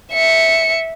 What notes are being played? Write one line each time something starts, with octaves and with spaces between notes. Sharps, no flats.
E5 C#7